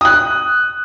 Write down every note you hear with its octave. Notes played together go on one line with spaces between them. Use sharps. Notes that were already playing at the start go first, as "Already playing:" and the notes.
D#6 F#6